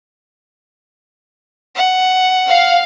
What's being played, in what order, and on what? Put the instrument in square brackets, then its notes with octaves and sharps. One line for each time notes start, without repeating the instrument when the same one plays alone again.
[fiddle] F#5
[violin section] F5